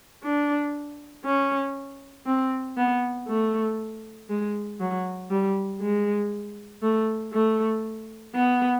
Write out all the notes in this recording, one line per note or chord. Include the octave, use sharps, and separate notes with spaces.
D4
C#4
C4
B3
A3
G#3
F#3
G3
G#3
A3
A3
B3